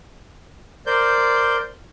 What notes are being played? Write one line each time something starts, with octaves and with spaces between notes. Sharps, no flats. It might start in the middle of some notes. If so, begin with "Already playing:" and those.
A#4 C5 D5 G6